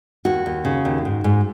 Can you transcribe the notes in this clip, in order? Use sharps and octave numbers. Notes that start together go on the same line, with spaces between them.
D#2 F#4
D#2
C#3
D#2
G#2
G#2